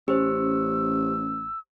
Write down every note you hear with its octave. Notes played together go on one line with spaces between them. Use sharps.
A1 C#4 G4 C5 E6